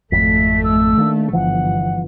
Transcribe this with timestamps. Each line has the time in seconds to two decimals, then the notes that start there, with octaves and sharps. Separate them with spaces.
0.12 G#1 F2 A3 B6
0.64 E6
0.97 D#3 A#3 D4
1.33 G1 E3 F3 F#5